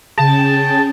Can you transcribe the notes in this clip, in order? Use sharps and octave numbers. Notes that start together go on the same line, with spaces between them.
C#3 C#4 G#4 G5 A5